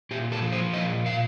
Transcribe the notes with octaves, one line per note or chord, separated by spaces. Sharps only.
A#2 G4
A4
F3
C5
A#2 D#5
A#2 F5